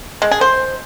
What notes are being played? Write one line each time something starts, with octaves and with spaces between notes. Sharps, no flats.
G#3
G#4
C5